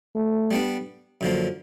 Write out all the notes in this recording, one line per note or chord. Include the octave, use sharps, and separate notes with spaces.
A3
G3 B3 D4
F#2 D3 F3 A#3